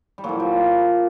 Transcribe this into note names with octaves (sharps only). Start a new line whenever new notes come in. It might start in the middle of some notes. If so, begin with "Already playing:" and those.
G3
A#2 F3 F#3
G3